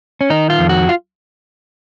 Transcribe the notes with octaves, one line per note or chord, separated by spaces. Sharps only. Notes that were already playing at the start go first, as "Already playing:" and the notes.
C#4
D#3 D#4
F4
F2
F#4
F4